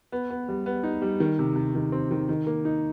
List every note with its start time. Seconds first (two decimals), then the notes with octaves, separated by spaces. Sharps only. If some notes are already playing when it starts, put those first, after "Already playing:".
0.12 B3
0.30 B3
0.49 G3
0.66 B3
0.83 D#4
1.02 G3
1.20 D#3
1.39 C3
1.56 C3
1.75 D#3
1.92 C4
2.11 D#3
2.29 D#3
2.47 A#3
2.65 D#4